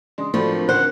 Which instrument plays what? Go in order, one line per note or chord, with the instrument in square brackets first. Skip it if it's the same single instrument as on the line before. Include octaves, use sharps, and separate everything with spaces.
[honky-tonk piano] C#3 G#3 D4 [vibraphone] C6 D#6
[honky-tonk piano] A2 F#3 A3 [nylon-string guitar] F3 [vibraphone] A4 D5 B5
[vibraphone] C4 D4 A#4
[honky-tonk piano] G#1 C#2 [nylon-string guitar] C5 [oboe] F#5